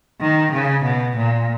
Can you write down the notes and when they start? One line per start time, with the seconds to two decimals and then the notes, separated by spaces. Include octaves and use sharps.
0.21 D#3
0.52 C#3
0.84 B2
1.17 A#2